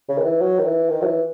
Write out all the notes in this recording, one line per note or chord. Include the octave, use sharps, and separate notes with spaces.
C#3
D#3
E3
F#3
D#3
E3
D#3
F#3
E3